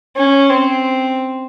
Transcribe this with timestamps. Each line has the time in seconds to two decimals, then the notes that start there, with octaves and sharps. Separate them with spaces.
0.16 C#4
0.50 C4